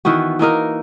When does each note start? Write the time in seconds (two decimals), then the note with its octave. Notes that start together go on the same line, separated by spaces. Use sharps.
0.05 D#3 E3 B3 F#4
0.39 E3 A#3 D#4 A#4